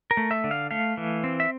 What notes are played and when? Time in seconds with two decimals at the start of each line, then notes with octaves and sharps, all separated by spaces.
0.11 A#4
0.17 A3
0.31 E5
0.44 D3
0.51 F5
0.71 A3 F5
0.97 E3
1.24 C4
1.40 E5